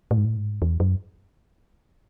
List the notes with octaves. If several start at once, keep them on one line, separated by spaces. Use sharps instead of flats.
A2
G#2
A2
G#2
E2
F#2